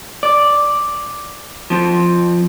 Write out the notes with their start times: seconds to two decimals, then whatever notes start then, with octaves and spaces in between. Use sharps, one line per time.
0.23 D5
1.70 F3 C4